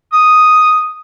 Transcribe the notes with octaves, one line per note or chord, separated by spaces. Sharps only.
D#6